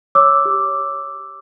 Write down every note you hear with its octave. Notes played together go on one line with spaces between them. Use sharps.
C#5 D6 E6
G4